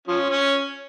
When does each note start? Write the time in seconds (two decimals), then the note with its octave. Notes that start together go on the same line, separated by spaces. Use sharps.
0.08 F3 C#4
0.30 C#4